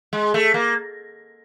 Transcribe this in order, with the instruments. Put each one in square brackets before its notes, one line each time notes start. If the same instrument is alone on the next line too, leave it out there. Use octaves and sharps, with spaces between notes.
[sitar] G#3
A3
A#3